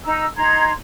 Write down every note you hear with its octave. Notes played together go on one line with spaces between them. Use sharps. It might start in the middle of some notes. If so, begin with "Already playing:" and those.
D#4 A#5 E6
D#4 A#5 C6 G#6